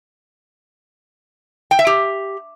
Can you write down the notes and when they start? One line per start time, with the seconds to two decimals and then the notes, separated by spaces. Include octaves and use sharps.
1.71 G5
1.79 E5
1.87 G4